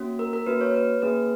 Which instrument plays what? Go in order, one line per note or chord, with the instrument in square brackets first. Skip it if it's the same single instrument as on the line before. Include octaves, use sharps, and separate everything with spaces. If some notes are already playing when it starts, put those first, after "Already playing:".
Already playing: [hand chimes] A#3 C#4 F#4
A#4
A#4
A#3 C#4 F#4 B4
C#5
B4
A#3 C#4 G#4 B4